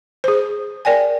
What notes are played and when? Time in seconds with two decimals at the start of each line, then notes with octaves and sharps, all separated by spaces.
0.24 G#4 C5
0.85 A#4 D5 G5 G#5